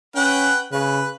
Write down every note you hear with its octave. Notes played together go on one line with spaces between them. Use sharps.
C#4 B4 F#5 G5
C#3 B4